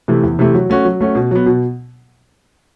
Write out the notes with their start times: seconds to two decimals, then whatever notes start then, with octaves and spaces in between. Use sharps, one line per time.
0.08 C3 E3 A3
0.23 E2
0.39 C3 E3 A3
0.54 F#3
0.70 A3 C#4 F#4
0.85 F#3
1.01 A3 C#4 F#4
1.15 B2
1.31 F#3 B3
1.46 B2